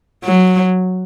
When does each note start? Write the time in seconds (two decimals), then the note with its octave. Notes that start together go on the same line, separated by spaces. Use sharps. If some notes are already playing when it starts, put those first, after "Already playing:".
0.24 F#3